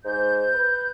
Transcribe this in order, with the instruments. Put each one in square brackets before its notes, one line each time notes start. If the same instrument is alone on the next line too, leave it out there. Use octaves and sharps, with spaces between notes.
[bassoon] G#2 [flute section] G6
[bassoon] B4